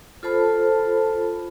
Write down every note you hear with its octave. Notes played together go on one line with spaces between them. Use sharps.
F4 A4 C5 A5 B5